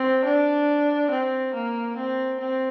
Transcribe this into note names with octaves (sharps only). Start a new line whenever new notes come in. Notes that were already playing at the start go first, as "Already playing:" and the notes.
Already playing: C4
D4
C4
A#3
C4
C4